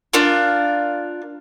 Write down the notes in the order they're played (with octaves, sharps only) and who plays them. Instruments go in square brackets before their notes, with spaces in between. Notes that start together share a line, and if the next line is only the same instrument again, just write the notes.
[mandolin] D4 F4 A#4